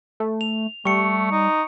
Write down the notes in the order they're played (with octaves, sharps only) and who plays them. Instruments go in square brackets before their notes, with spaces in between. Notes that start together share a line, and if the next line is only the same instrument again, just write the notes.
[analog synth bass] A3
[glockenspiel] F7
[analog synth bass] G3 [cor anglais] A3 [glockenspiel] C#6 C#7
[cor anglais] D#4